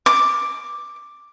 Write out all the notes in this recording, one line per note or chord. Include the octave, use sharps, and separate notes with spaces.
D6